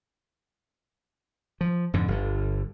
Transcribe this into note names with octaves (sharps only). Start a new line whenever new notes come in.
F3
F2 G#2 D3
G1 D3